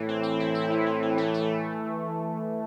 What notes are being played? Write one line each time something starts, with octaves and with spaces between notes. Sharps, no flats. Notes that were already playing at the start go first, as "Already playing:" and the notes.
Already playing: A2 E3
C4
C4
E4
E4
E3
E3
E3
A3
A3